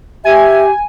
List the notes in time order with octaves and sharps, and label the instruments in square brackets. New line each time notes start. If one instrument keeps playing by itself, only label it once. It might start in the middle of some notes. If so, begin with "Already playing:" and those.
[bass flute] G4 [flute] E5 [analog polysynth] G#5